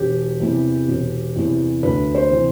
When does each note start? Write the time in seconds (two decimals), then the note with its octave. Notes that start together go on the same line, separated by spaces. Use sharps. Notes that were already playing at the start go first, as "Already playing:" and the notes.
Already playing: E1 G4
0.40 E2 C3 E3
0.88 E1
1.36 E2 C3 E3
1.83 D2 B4
2.15 C5
2.30 C3 E3